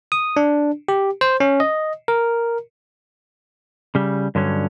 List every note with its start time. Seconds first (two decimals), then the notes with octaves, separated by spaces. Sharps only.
0.12 D#6
0.37 D4
0.88 G4
1.21 C5
1.40 C#4
1.60 D#5
2.08 A#4
3.95 C#3 G3
4.35 G2 D3 F#3 C#4